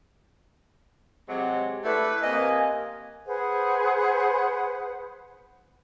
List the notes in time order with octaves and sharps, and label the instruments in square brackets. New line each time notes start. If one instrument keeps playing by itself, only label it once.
[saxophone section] C3 F#3 G#3
[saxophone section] A3 D4 E4 [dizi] B4
[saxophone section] C3 A#3 [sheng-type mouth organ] D#5 [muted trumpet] G#5
[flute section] G#4 B4 C5 F#5